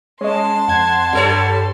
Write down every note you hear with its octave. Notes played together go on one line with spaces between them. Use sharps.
G#3 C#4 D#5 A5 C6
F2 F#5 G#6
G2 G3 A4 C#5